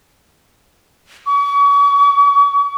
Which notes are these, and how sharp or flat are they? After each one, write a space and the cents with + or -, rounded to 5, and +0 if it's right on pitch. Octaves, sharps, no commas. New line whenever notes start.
C#6 +40